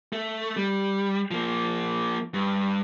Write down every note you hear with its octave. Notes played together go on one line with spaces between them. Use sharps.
A3
G3
F3 A#3
G2